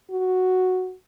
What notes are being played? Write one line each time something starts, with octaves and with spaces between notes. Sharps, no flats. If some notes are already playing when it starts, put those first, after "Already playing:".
F#4